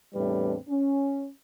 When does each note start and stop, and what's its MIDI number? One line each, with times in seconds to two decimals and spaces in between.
0.14 0.56 40
0.14 0.56 45
0.14 0.56 55
0.14 0.56 60
0.14 0.56 62
0.14 0.56 71
0.69 1.27 61